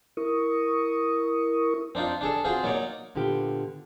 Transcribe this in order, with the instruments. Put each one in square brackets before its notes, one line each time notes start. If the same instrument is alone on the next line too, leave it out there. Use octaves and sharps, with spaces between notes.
[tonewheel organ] E4 A#4 C#6 D#6
[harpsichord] C4 D4 D#4 F4
D4 G#4 A4
C4 F4 F#4 G#4
F#3 A#3 D#4 C#5 D5
[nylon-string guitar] A#2 D3 B3 F4 G4